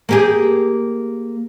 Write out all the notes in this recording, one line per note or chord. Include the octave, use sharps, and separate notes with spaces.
A#3 G4 G#4